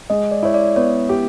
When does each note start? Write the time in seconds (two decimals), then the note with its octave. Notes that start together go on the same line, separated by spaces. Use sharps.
0.10 G#3 D#5
0.31 D5
0.43 E4 C#5
0.54 D5
0.76 B3 C#5
1.09 G4